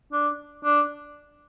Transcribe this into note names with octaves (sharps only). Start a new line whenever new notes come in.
D4
D4